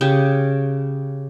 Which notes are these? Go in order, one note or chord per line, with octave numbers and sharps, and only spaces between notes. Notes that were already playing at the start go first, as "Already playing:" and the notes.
C#3 G4